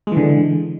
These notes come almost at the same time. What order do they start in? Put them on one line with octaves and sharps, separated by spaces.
G#3 E3 D3